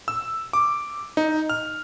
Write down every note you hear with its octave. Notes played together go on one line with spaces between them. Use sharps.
E6
D6
D#4
F6